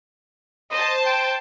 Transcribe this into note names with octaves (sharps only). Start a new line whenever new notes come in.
C5 D#5 A5
G5